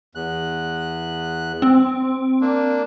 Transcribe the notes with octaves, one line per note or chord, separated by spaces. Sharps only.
E2 F#6
C4
A#3 D4